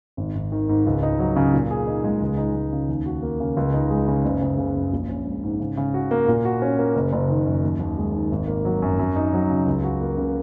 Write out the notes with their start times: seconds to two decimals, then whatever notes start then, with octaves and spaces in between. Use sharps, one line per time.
0.17 G#1
0.35 G#1
0.52 D#3
0.69 G#2
0.86 C#2
1.03 D#4
1.19 F#3
1.36 C#3
1.53 A#2
1.71 G#4
1.87 D#4
2.04 G#3
2.22 C#2
2.37 D#4
2.55 G#3
2.73 C#3
2.88 D#2
3.06 F#4
3.23 A#3
3.40 C#3
3.57 C#2
3.74 D#4
3.90 G#3
4.08 C#3
4.25 F#1
4.42 F#1
4.58 C#3
4.76 F#2
4.93 A#1
5.09 C#4
5.26 G#3
5.43 G#2
5.60 C#3
5.77 C#3
5.94 F#4
6.11 A#3
6.28 A#2
6.45 F#4
6.62 C#4
6.79 A#3
6.96 F#1
7.13 F#1
7.30 D#3
7.46 F#2
7.63 D#2
7.80 D#2
7.98 G#3
8.15 D#3
8.31 G#1
8.48 A#3
8.65 F#3
8.82 F#2
8.99 F#2
9.16 D#4
9.33 F#3
9.50 C#3
9.66 C#2
9.84 F#4
10.00 A#3
10.18 C#3